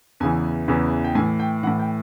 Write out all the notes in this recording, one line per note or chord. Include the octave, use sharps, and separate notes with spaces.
E2 C#3 E3 G#5
E2 C#3 E3
G5
A2 E3 G#5
G5
A2 E3 F#5
G5